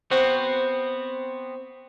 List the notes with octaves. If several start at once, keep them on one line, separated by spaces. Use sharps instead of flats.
B3 C4 F#4 C5